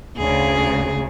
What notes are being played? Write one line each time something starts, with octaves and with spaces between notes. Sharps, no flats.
D2 C#3 G#4